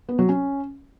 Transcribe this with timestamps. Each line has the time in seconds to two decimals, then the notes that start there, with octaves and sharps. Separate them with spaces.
0.09 B3
0.19 F#3
0.29 C#4